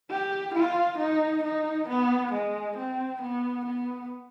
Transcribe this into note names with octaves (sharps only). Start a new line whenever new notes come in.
G4
F4
D#4
D#4
B3
G#3
C4
B3
B3